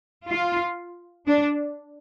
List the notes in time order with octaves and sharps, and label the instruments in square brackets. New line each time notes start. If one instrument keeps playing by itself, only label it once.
[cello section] F4
D4